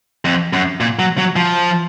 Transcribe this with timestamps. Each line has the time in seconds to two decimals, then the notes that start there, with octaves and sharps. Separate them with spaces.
0.25 F2
0.53 F#2
0.80 A#2
0.99 F#3
1.18 F#3
1.36 F3